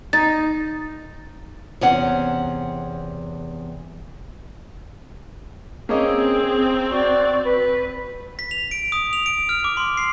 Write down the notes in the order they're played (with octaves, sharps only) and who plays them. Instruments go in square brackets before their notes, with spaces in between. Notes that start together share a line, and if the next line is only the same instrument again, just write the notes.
[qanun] D#4 [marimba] A6
[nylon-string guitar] E2 C3 C#4 F#5
[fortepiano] A#3 C#4 D#5 [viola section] C4 [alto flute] G#4
[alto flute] F#4 [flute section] D5 C#6
[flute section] B4
[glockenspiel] B6
F7
D7
D#6
F7
D7
F6
D6
C6
C7